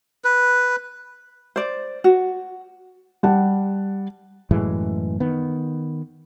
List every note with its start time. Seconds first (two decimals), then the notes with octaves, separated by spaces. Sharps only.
0.24 B4
1.56 C5 D5
2.04 F#4
3.23 G3 G4 F#5 A5
4.51 F#2 A2 E3 G#3
5.20 D#3 B3